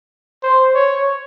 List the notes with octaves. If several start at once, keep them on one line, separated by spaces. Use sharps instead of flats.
C5
C#5